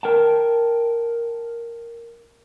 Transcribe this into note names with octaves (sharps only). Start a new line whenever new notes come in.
A#4 G5 A5